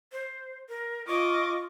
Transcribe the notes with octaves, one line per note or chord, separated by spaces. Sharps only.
C5
A#4
F4 D#5 C#6 D6